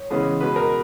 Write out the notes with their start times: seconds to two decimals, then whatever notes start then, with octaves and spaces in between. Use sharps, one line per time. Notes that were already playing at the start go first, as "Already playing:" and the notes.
Already playing: C#5
0.10 C#3 E3 G#3 B3
0.40 B2 G#3 B3 B4
0.56 A#4